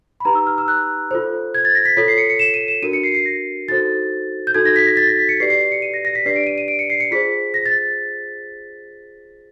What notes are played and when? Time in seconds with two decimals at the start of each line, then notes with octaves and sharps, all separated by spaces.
0.20 B5
0.25 D#4 G4 B4 A#5
0.35 E6
0.47 F6
0.58 E6
0.68 F#6
1.11 F4 A4 C5
1.55 G#6
1.65 A6
1.75 A#6
1.86 B6
1.97 F4 A4 C#5 B6
2.08 C7
2.18 C#7
2.30 C#7
2.39 E7
2.54 D#7
2.68 E7
2.82 D4 F#4 A#4 D#7
2.93 C#7
3.03 C7
3.14 C7
3.26 A#6
3.68 D#4 F#4 A4 C5 A6
4.47 G6
4.54 D#4 F#4 A4 G#6
4.66 A#6
4.76 B6
4.86 A#6
4.97 A6
5.08 A#6
5.19 B6
5.29 C#7
5.40 G4 B4 D5 C7
5.50 C7
5.61 C7
5.72 C#7
5.82 D#7
5.94 A#6
6.05 A#6
6.15 B6
6.26 D4 G4 B4 D5 C7
6.36 D7
6.47 D#7
6.58 D#7
6.68 D7
6.79 C#7
6.90 C7
7.00 C#7
7.11 F4 G#4 C5 B6
7.54 A#6
7.66 A6